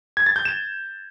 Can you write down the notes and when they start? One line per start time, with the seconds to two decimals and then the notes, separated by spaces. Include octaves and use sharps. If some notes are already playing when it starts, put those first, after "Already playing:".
0.17 G#6
0.26 A6
0.36 G6
0.45 E7